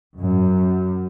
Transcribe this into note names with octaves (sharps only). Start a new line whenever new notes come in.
F#2